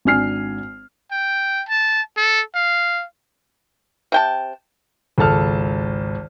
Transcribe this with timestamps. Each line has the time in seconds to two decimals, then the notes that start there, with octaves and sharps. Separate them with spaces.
0.05 G#1 D4 G#5 F6 C7
1.12 G5
1.69 A5
2.17 A4
2.55 F5
4.12 C3 G5 A5
5.18 G#1 C#2 A4 A5 F6